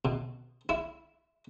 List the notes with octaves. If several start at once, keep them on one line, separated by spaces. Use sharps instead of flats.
B2
E4